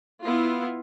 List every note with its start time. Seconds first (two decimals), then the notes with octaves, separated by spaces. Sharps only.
0.24 B3 E4 F4